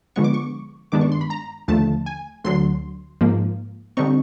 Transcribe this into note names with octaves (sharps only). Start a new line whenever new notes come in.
D3 F3 G#3 B3 C#6
D6
C#6
G2 D#3 G#3 B3 D4 D6
C#6
C6
B5
A#5
D#2 D3 F3 A3 A5
G#5
D2 D3 F#3 C6
G#2 F3 A#3
D3 G3 C4 D#4 C#6